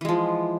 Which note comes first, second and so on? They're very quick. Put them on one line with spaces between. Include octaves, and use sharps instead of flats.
E3 G#3 F3